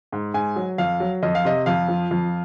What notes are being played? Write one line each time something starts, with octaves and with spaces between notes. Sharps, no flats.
G#2
G#2 G#5
F#3
F2 F5
F#3
F2 D#5
F5
C3 D#5
F2 F5
F3
F2